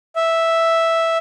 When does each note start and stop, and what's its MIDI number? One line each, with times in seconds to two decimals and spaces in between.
0.16 1.17 76